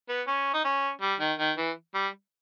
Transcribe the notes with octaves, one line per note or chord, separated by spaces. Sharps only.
B3
C#4
D#4
C#4
G3
D#3
D#3
E3
G3